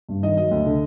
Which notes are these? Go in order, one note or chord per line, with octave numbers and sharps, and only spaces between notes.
G2
D#3 D#5
F#3 D#5
D2
D3